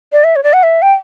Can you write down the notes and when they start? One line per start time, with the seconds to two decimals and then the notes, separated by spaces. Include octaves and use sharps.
0.12 D5
0.24 E5
0.36 C#5
0.43 D5
0.53 F#5
0.63 E5
0.82 G5